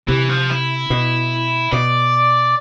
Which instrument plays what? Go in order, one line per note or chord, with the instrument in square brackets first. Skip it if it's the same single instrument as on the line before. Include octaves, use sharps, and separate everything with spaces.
[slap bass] C3 [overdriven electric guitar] E3
[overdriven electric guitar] F3
E4
[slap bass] B2
[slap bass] B2 [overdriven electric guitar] D5